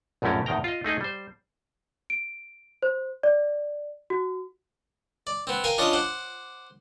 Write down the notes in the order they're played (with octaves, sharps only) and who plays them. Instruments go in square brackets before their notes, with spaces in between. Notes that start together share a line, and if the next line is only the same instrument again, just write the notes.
[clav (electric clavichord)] A#1 F#2 A2 A3 C#4 A#4
E2 A2 D#3 G5 A#5
F4 D#5
A3 D#4 G#4 D#5
G3 C5
[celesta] D7
C5
D5
F#4
[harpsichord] D5
B3 C4
A#4 F5 G5 G#5
C#4 D4 F4 D#5 D#6
C5 F#5 D6